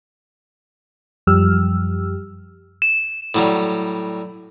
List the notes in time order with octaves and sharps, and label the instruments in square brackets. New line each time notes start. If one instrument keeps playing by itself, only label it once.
[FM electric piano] F#2 F3 G3 G4 E6 F6
[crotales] E7
[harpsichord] A2 F#3 G3